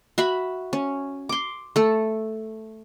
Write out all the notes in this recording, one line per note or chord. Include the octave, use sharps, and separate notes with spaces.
F#4 E5 B5
C#4
C6 D6
A3 A4